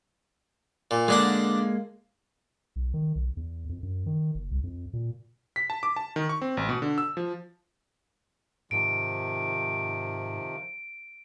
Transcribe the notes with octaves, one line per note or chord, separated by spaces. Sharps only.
A#2
D3 G#3 A#3 D4 F#5
B1
D#3
B1
E2
F2
F#2
D#3
F#1
C2
F2
A#2
B6
A5
D6
A5
D#3
C#6
C4
A1
B2
D3
E6
F3
G#2 C3 D#3 F3 D7